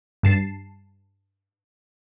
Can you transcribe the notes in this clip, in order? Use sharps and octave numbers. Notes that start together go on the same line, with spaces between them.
G2 A5 C7